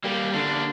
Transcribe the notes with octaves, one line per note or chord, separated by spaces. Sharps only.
G3 A#3 G4
D3 A#3 D4